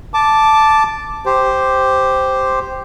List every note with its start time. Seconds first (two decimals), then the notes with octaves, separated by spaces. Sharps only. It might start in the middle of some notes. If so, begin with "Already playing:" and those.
0.14 A5 D6
1.26 G4 C5